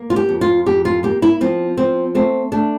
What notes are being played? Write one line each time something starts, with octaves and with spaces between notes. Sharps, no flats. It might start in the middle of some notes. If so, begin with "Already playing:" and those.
Already playing: A#3
F4
G4
F2
F4
F2 G4
F4
A#3 G4
E4
F3 C4
F3 C4
A3 C4
A3 D4